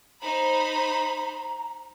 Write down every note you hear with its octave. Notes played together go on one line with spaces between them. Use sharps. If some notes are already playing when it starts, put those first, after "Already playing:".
D#4 C5 A#5 B5